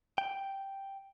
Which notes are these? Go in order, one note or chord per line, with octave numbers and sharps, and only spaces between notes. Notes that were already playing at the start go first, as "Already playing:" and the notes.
G5